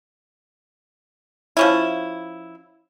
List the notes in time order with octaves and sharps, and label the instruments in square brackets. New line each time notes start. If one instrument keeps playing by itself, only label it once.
[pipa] F3 C#4 E4